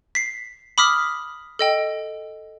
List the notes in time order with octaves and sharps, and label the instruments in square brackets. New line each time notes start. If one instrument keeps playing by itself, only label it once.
[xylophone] B6 C7
B5 D6 D#6 F6 B6
A4 D#5 G5